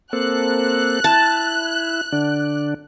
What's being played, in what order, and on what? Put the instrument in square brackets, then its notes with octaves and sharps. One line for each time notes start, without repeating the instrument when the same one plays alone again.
[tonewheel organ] A#3 C4 A4 [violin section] F#6
[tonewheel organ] E4 [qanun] A5
[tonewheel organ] D3 D4